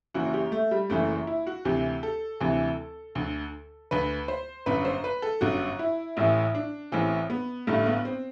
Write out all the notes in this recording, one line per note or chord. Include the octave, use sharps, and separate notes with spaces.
F#1 F#2 E3 F#4
G4
A3
G3
F#1 F#2 E3 A3
E4
F#4
D2 C3 E3 G4
A4
D2 C3 E3
D2 D3
D2 D3 B4
C5
G1 F#2 D3 B4
C5
B4
A4
G1 F#2 D3 F#4
E4
A1 A2 E3 E4
D4
A1 A2 E3 C4
B3
A1 G2 D3 A3
B3
C4